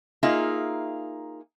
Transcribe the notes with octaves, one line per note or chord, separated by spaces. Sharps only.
A#3 D#4 F4 G#4 E5